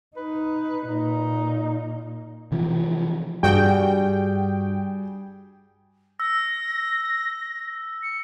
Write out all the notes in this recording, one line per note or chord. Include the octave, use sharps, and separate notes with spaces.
D#4 B4
A#2 D#4
C3 E3 F3
G2 G3 F#4 G#4 G5
E6 A#6
C#7